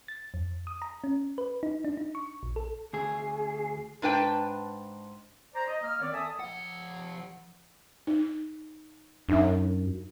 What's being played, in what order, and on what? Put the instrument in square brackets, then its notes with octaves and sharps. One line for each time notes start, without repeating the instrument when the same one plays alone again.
[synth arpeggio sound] A6
F2
D#6
A#5
C#4
B4
D#4
D4
D#4
C#6
A#1
A4
[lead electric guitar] D2 G#4
[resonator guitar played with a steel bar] G#2 D4 B4 G5 A5
[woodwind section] C5 D5 A#5
D#5
A#3 F6
D#3 B3 C4 C#5 D5
A4 E5 G#5 A5 D#6
[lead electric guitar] F3 F#5
[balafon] D#4
[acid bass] F#2 [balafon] D4 D#4 E5